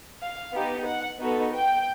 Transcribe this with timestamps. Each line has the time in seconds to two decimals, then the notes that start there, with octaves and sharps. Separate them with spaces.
0.22 F5
0.54 B3 D#4 G4
0.87 F#5
1.20 B3 D#4 F#4 A4
1.53 G5